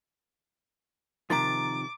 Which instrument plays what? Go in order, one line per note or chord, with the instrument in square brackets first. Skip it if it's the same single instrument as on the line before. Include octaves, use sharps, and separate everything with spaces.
[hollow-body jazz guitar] C3 D#3 F3 [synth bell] A#5 A6 [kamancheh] D6